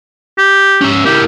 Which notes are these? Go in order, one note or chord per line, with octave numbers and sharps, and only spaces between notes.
G4
C#4 E5
A#3 E4 G4